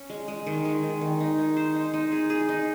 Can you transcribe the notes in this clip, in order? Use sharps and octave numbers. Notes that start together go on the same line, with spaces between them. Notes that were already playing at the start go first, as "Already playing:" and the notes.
Already playing: C#4
G#3
G#3
D#3
G#3
D#3
D#3
D#4
G#3
C5
D#4
D#4
G#4
G#4
D#4